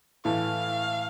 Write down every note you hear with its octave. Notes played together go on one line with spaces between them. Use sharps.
A2 E3 A3 E4 F5